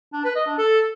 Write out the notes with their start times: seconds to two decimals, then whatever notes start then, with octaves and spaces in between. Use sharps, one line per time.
0.13 D4
0.24 B4
0.36 D#5
0.47 D4
0.58 A4